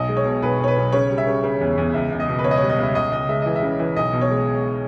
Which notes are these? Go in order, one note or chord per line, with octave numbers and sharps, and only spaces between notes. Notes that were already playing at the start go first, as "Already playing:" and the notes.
Already playing: B1 D#5
G#3
C#5
B2
B1 B4
B1 C#5
B4
B1
C#3 C#5
G3
E5
C#3
C#3
E2
E2
C#2 E5
C#2
D#5
B2
B4
C#2 C#5
D#5
C#5
G3
D#5
C#2 E5
C#2 D#5
C#2 D#5
G#3 E5
E3 D#5
E5
C#3
E3
B1 D#5
B2
C#5
G#3